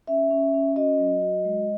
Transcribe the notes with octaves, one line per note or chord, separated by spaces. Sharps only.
C#4 E5
C#4
C#4
F#4 D#5
F#3
F#4
G#3